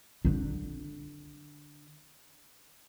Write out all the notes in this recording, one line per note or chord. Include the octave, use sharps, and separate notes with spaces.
D3 D4